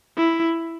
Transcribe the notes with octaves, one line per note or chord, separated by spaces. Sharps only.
E4